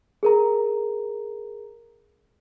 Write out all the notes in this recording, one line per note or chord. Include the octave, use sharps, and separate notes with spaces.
G#4 A#4 A#5